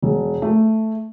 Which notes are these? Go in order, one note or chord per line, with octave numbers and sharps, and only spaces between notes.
E1
A3